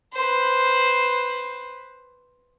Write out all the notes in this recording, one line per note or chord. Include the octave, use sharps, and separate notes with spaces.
B4 C5